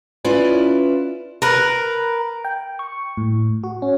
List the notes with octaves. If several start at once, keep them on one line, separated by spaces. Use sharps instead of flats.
C#4 E4 F4 B4 D5
A#4 B4
G5
C#6
A2
F#4
C#4